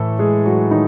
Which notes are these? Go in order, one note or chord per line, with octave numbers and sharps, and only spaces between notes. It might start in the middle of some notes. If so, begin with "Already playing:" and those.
Already playing: A2 E3 A3 A4
G#3 G#4
F#3 F#4
D#3 D#4